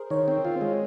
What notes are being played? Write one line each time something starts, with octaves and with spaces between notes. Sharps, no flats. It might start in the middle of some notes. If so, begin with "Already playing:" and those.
Already playing: G#4 A#4 C5
D#3 C#5
C4
F4
G#3